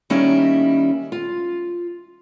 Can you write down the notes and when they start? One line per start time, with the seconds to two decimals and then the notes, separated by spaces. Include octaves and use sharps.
0.10 D#3 G3 A#3 C#4 E4 D#5
1.12 F4